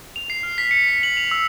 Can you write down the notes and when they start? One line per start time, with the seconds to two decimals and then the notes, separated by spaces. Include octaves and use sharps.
0.16 F7
0.30 C7
0.43 F6
0.58 B6
0.71 C#7
0.88 B6
1.03 F#7
1.17 F7
1.31 E6